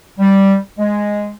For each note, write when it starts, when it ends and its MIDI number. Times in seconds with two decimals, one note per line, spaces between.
0.19 0.56 55
0.79 1.29 56